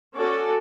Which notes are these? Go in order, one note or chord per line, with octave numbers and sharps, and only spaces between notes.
C#4 F#4 A4 D5